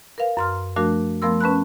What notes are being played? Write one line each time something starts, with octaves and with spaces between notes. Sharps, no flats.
A#4 B4 F5
F#2 C6 F6
F3 A3 D4 F#4 A#4
F3 A3 B3 A#4 C6 E6
C#4 B4 A5 B5 F#6